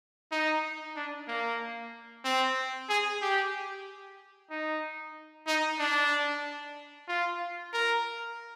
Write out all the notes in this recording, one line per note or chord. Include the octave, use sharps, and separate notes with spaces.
D#4
D4
A#3
C4
G#4
G4
D#4
D#4
D4
F4
A#4